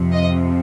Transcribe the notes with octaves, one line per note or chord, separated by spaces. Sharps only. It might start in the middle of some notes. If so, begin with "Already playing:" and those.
Already playing: F2 C3 F3
D#5